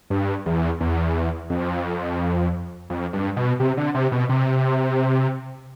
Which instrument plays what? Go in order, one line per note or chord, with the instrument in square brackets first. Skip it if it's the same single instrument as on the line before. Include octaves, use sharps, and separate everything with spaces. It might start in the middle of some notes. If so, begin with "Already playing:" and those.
[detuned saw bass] G2
E2
E2
F2
F2
G2
B2
C3
D3
C3
B2
C3